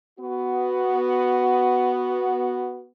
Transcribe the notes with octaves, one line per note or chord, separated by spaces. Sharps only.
B3 F#4